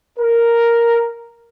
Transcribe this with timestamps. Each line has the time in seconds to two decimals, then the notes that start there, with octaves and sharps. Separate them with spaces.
0.19 A#4